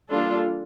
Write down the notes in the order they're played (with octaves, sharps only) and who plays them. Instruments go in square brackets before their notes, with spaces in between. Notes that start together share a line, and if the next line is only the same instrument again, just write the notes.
[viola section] E3 G3 A#3 D4 F4 A4